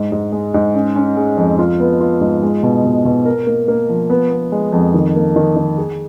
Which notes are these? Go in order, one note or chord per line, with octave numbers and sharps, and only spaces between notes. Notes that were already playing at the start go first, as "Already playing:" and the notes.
Already playing: G#2
G#2
G#3
G#2
C#4
C#4
G#3
F2
F4
B3
F4
G#2
G#3
B2
B2
B2
A#4
A#3
A#3
F3
B3
B3
G#3
F2
D#3
A#3
D#3
D#3
G#4